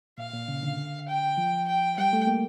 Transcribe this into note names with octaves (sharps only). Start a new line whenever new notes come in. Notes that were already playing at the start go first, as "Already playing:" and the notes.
A#2 F5
A#2
C#3
D3
G5
F3
G5
G3 G5
A3
A#3